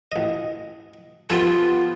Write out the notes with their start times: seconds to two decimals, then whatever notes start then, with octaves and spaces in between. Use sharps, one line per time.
0.12 A1 D#5
1.30 F3 B3 F4 G4 A4 G#5 A5